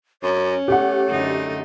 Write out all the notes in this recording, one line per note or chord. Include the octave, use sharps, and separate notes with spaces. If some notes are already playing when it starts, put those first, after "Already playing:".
F#2 C#4 C#5
A3 G4 F#5
F#2 D3 D#4